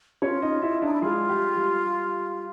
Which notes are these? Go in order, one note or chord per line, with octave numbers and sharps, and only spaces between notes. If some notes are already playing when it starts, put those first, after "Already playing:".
C#4 F4 C#5
D#4 D#5
E4 E5
D4 D#4 D5
E4
G#3 F4 G#4
G3 G4
G3 G4